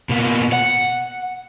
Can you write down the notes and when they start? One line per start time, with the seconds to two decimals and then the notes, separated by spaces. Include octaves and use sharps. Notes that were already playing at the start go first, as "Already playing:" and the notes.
0.09 B2 A#3
0.53 F#5